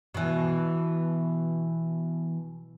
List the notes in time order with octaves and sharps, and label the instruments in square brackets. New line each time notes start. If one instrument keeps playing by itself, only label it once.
[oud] B2 E3